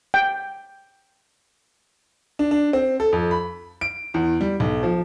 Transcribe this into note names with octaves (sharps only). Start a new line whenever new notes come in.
G5
D4
D4
C4
A4
F2
B5
D7
E2
G3
B1
F3